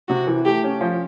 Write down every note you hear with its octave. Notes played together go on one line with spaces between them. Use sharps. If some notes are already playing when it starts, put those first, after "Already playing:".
C3 F#4
E3
A3 G4
C#4
F3